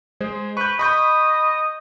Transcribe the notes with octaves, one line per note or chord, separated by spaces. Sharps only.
G#3 G#4 C5
B4 C#6 G6
D#5 B5 C#6 G6